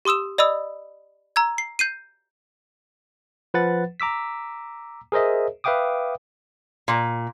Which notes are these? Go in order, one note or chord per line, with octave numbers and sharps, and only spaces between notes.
G4 C6 D#6 E6 E7
D5 D#5 B5 D#6 E6
A#5 E6 G#6
C7
G6 C7 D#7
F3 B4 F#5 A6
A#5 D6 E6 B6
G#4 A#4 C5 D#5 E5
B4 E5 F5 G5 D6 D#6
A#2